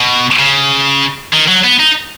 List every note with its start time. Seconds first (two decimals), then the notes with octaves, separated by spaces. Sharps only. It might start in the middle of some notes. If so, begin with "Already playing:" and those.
Already playing: B2
0.39 C#3
1.33 D#3
1.48 F#3
1.64 B3
1.79 D#4